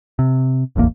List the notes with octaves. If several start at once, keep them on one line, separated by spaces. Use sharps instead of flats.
C3
D1 A1 E2 A#3